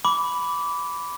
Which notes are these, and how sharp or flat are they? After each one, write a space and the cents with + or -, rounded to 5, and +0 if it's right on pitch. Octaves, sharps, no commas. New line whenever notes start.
B5 +0 D6 -20